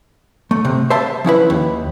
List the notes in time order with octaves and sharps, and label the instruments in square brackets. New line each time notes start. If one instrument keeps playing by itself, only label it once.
[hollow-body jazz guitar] A3
C3
C5 E5 A5
F3 C#4 E4 B4
D#2